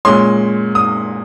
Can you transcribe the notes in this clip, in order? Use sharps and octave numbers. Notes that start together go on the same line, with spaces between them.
A#2 G#3 C#4 C6
D#6